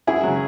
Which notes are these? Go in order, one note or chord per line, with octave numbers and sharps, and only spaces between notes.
F#2 E4 G#4
C#3 F#3